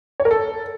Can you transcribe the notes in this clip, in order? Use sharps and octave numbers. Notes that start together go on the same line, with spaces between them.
C#5
A#4
A4